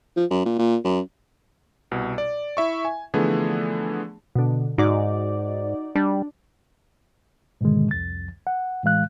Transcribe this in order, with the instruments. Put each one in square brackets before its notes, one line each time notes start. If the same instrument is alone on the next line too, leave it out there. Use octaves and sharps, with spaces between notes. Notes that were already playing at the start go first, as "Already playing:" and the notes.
[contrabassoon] F3
F#2
A#2
A#2
F#2
[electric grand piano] C2 B2
D5
E4 E5 C#6
G#5
D3 E3 F3 A3 B3 G#4
[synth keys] B2 D3
[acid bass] G#2 [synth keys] D#4 F#4 D5
[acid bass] G3 [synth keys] D4
[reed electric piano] G#2 B2 D3 D#3 G#3
C2 F2 A6
F#5
A2 E3 G#3 F5 F#6